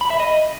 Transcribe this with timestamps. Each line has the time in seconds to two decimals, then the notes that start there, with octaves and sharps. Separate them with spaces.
0.01 B5
0.10 E5
0.20 D#5